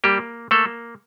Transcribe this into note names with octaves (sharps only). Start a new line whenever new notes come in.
G3 A#3 G4
A3 A#3 A4